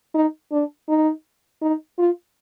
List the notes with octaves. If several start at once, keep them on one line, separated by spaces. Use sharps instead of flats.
D#4
D4
D#4
D#4
F4